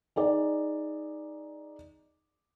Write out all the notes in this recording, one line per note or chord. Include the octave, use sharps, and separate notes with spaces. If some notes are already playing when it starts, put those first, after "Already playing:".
D#4 G#4 D5